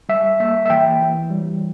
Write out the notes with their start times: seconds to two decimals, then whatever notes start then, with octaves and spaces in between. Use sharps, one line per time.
0.09 G3 E5
0.40 A#3 E5
0.66 E5
0.70 E3 G5
1.01 E3
1.31 G3